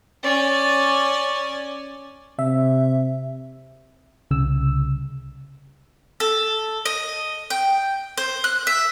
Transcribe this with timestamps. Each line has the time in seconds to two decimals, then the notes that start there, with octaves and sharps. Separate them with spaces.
0.23 C#4 D5
2.39 C3 E5
4.31 C2 C#3 E6
6.20 A4
6.85 D#5
7.50 G5
8.17 C5
8.44 F#6
8.67 E5